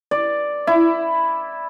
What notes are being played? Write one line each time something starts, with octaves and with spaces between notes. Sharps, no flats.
D5
E4